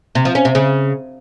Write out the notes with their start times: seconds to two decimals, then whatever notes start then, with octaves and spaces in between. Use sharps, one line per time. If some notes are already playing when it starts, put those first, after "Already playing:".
0.15 C3
0.25 F3
0.35 C#4
0.45 C3
0.55 C#3